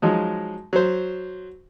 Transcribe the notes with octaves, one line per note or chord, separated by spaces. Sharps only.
F3 F#3 G#3 D#4
F#3 C5